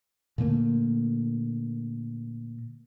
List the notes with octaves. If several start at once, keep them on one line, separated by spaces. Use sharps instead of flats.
A#2 D3 A3 A#3